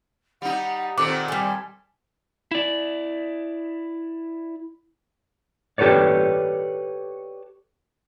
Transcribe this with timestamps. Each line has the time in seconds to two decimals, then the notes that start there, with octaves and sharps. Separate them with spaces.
0.42 G3 D#4 F#5
0.80 F#5
0.98 A#2 D#3 C4 A4 F#5 D6
1.28 G3 A4 G#5
2.51 E4 D5
5.78 G4 A4 B4 C#5 D5